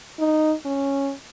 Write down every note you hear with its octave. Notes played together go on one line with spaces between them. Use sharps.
D#4
C#4